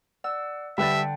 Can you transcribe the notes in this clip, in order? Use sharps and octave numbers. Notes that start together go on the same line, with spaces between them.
D5 F#5 E6
D3 G3 B4 E5 F#5 G5 A6